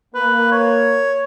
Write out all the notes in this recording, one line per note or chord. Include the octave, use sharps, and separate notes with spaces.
A#3 B4
C#5